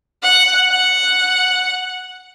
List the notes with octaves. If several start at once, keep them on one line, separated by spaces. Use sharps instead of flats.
F#5
F#5